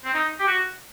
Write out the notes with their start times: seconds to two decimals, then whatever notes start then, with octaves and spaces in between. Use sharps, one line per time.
0.04 C4
0.14 D#4
0.40 G4
0.47 F#4